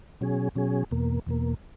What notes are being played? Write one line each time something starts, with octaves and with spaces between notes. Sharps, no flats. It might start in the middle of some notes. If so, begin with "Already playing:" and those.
B2 F#3 C#4 G#4
B2 F#3 C#4 G#4
E2 B2 A#3
E2 B2 A#3